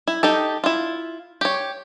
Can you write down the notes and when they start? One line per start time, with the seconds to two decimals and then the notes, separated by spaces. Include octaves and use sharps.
0.08 E4
0.23 D#4 G4 A4
0.64 E4 F4
1.41 G4 C#5